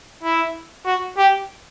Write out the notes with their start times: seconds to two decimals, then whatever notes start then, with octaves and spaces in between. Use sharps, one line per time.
0.23 E4
0.86 F#4
1.18 G4